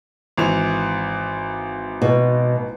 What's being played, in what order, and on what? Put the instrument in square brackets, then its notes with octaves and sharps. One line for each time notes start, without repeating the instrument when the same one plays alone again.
[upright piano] G#1 E3 F7
[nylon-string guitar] B2